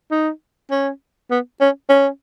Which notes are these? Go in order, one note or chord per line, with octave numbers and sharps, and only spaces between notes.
D#4
C#4
B3
C#4
C#4